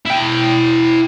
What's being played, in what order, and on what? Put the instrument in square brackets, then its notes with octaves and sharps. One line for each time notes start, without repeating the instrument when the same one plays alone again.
[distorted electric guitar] E4 G5